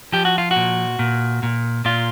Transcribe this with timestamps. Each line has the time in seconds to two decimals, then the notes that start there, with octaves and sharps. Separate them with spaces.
0.12 F3 G4
0.25 F#4
0.38 F4
0.51 F#4
0.56 A#2
0.99 A#2
1.43 A#2
1.85 A#2 F4